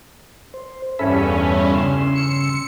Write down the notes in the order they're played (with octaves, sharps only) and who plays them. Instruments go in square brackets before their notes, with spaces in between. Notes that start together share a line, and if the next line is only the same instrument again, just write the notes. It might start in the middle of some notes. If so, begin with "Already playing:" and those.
[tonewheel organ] C5
[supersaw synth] E2 G2 C#4 [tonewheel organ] A4 E5 B5
[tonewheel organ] C#3 C6 E6
[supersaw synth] C#7